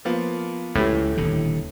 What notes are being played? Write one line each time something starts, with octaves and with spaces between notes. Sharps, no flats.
F3 A#3 B3
C#2 A2 E3 G4
D#1 D#2 D3